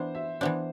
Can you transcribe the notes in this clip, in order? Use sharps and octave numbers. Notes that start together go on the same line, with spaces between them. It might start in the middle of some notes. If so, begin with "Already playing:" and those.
Already playing: E3 B3 D4 C5
E5
E3 B3 D4 C5